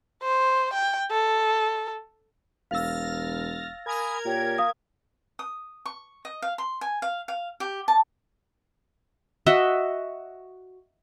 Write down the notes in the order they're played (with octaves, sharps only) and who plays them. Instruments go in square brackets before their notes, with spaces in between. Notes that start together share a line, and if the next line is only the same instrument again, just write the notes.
[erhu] C5
G5
A4
[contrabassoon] E1 [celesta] F5 E6 [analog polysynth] F6 A6 A#6
[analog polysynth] A#4 G#6 [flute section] G#5 B5 D#6
[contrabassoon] A#2 [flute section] G4 C#5 G5
[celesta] F5 D#6
[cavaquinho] D#6
C#6
D#5
F5
C6
G#5
F5
F5
G4
A5
[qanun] F#4 D#5 E5